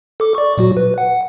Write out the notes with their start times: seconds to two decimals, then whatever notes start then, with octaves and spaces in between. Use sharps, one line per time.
0.20 A4 D6
0.35 D5 C#6
0.58 A#2 F#3 F#4
0.77 B4
0.98 F#5